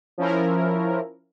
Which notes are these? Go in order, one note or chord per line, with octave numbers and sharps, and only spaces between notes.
F3 C#4 E4 A#4